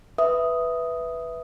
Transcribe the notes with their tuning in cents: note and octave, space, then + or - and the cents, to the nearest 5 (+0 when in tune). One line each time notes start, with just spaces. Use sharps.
B4 +0 E5 +0 D#6 +0